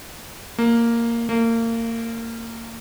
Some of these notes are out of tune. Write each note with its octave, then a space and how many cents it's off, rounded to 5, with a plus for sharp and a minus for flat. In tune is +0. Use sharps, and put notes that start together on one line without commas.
A#3 -5
A#3 -30